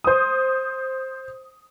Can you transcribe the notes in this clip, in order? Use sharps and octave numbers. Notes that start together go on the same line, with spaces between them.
C5 D#6